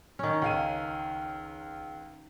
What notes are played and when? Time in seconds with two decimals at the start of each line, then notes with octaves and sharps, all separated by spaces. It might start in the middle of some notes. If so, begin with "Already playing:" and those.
0.19 D#3 C#4
0.42 C#2 F5 D#7